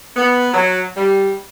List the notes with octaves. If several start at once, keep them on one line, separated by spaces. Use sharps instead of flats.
B3
F#3
G3